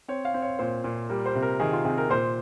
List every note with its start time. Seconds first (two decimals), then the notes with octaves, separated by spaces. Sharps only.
0.08 C4 C#5
0.25 F5
0.34 C4
0.42 C#5
0.59 A#2 C5
0.84 A#2
1.09 G3 A#4
1.26 C5
1.35 C3
1.42 A#4
1.60 D#3 G#4
1.73 F4
1.84 C3 G#4
1.98 A#4
2.10 A#2 C5